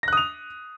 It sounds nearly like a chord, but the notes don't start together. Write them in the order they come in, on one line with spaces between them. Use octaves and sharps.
A#6 F#6 D#6 F7